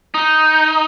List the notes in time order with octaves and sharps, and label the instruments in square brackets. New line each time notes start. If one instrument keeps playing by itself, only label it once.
[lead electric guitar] D#4